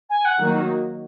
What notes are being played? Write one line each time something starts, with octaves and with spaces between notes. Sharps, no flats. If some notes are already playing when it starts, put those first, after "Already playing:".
G#5
F#5
D#3 F#3 A#3 D#4 F#4